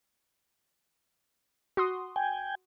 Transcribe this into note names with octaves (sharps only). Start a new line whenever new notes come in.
F#4 C6 D#6
G5 G#5